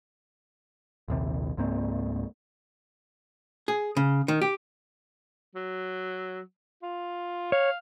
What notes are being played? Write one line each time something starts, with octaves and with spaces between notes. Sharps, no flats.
A#1 D#2 C3
C#2 G#2 A#3 C4
G#4
C#3
D#3
G4
F#3
F4
C#5 F5